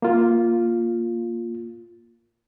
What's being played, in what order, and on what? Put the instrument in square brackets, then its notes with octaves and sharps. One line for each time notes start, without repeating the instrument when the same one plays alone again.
[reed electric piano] A#3 F4